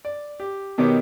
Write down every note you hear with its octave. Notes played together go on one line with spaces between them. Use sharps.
D5
G4
B2 D#3 B3 G4 C#5 D6